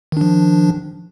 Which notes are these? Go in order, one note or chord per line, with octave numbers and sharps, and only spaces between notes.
D#3 F3 D4